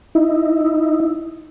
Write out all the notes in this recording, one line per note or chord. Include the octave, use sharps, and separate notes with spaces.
D#4 E4